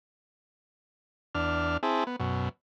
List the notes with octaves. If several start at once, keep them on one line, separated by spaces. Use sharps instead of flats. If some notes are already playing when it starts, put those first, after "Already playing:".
E2 D4 F6
C4 E4 G#4 A5
B3
F#2 B2